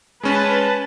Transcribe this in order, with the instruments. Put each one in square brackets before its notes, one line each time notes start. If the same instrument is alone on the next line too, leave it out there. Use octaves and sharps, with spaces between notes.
[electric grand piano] G#3 C#4 [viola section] B4 A5